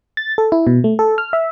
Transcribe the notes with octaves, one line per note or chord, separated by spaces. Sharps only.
A6
A4
E4
B2
A3
A4
F6
E5